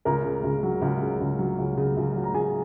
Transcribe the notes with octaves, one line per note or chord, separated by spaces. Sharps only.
C#2 A#4 A#5
C#3
C#2
F#3
C#2
C#3
C#2
F#3
C#2
C#3
C#2
F#3
A#5
C#2 G#4 G#5